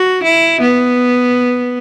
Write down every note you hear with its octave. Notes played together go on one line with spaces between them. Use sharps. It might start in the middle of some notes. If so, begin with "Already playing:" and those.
Already playing: F#4
E4
B3